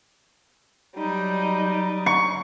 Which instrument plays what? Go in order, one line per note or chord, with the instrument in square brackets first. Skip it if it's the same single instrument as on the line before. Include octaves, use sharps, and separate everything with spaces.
[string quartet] F#3 G3 D#4
[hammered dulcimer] C#6